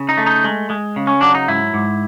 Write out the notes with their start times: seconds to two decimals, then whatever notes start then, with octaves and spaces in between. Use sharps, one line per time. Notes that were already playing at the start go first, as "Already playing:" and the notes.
Already playing: C#3
0.09 D#4
0.17 A3
0.26 D#4
0.44 G#3
0.70 G#3
0.96 C#3
1.07 C#4
1.21 F#3 D4
1.35 D#4
1.48 G#2 E4
1.74 G#2